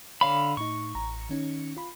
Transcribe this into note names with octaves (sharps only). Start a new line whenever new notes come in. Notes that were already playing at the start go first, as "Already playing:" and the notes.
D3 C#5 F5 B5
A2 D#4 C#6
A1 A#5
D#3 C#4 D#4
F4 B5